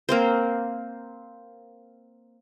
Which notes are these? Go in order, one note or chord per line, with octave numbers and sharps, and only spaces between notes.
A#3 C4 C5